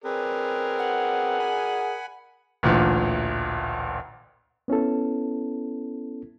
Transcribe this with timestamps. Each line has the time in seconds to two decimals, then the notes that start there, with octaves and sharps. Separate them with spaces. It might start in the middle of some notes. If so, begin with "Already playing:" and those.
0.04 C4 G#4 A#4 B4 D5
0.78 F#5
1.39 G#5 B5
2.63 A1 D2 A#2
4.68 B3 C#4 E4 A4